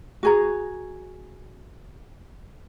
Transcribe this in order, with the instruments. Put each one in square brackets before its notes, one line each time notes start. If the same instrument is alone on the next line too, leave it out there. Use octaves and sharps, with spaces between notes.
[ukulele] F#4 G#4 A#5